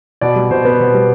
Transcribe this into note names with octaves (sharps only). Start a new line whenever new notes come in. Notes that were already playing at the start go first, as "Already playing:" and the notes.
B2 D5
G3
B2 C5
B3
B2
G3